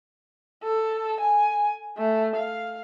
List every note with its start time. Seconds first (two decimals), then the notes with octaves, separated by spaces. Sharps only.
0.63 A4
1.20 G#5
1.98 A3
2.36 F5